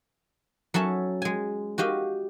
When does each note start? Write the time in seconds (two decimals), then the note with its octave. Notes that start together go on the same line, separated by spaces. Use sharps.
0.74 F#3 C#4 A4 E5
1.22 G#3 G#5
1.78 F#4 G4 D#5 F5